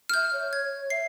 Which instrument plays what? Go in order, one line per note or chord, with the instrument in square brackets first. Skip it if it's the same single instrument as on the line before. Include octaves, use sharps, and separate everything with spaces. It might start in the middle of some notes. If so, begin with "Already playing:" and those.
[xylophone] F6
[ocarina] E5 [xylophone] G6
[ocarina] C#5
[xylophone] G#6
[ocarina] E5 [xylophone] C7